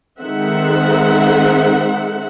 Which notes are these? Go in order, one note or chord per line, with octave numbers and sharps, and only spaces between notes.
D#3 G#3 C4 A4 E5 F#5